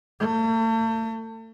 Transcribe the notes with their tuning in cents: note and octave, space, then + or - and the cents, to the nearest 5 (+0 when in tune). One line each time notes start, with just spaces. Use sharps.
A3 +40